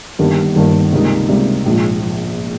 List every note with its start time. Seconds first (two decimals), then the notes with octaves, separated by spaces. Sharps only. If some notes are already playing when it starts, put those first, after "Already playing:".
0.19 G1 G2 D#3 G3 A#3
0.56 G1 G2 D#3 G3 A#3
0.92 C#2 C3 G3 A#3 D#4
1.29 C#2 C3 G3 A#3 D#4
1.66 A#1 G#2 F3
2.01 F3